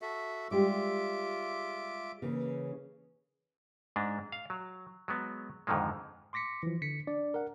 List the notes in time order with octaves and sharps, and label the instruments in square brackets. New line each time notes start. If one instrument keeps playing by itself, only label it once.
[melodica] F#4 A4 E5
[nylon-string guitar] G3 G#3 G4 [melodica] F4 E5 D6
[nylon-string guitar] C#3 E3 A#3
[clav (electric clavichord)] G#2 G#3 D4
F5
F#3
F#3 G#3 B3
F2 G#2 D3 D#3 F3 G#3
[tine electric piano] C6 D6 A#6 B6 C#7
E3 F3
D3 B6 C#7
D4 D5
A#4 F#5